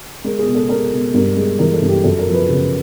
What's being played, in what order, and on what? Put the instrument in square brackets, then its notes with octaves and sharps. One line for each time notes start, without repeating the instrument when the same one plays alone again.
[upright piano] G#3 A#4
G#4
B2
A4
G#3 A#4
B2
G2 A#4
G#3
E3 A#4
A4
G2
G4
F#2 A4
A#4
F3
B4
C#3